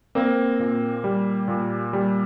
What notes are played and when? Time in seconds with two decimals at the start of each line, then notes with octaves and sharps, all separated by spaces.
0.15 A#3 C4
0.59 A#2
1.04 G3
1.48 A#2
1.93 G3